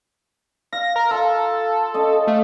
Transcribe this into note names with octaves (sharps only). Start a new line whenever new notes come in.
F5 A#6
A#4
F4 A4 F5 A5
C#4 D#5
A3 F5